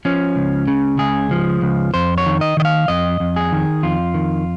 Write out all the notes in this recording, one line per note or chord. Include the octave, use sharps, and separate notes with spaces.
F3 C#4
C#2
C#3
C#2 G#4
F3
C#2
F2 C5
C#5
D#3
D#5
D#3 D#5
F5
F2 D#5
F2
G#4
D#3
F2 F4
D#3